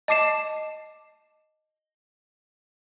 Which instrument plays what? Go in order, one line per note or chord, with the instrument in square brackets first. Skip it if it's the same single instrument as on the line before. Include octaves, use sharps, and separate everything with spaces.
[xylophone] D#5 A5 D6 C7 E7